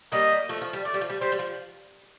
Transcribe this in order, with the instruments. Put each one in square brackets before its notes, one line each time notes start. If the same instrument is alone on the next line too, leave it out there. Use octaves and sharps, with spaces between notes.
[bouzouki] G3 A#3 [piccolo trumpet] D#5
[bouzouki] F3 A3
F3
G3
[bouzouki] A3 [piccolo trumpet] D5
[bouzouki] G3
F3
G3
[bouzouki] G3 [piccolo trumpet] C5
[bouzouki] G3
F3